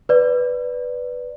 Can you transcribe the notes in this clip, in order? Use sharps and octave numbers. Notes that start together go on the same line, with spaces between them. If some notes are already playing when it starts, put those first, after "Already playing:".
B4 D5